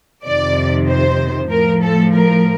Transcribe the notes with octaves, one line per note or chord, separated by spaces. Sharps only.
F2 C3 D#3 D5
C5
A2 F3 A#4
A4
A#4